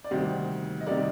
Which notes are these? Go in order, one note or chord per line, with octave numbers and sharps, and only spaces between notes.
D5
D2 C3 D#3 G3 A#3 C5 D#5
D#5
C3 D#3 G3 A#3 A#4 D5